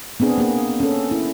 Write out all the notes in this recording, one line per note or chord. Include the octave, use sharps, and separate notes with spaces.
B3 C4 D4 G#4
A#3 G#4
C#4 A4
E4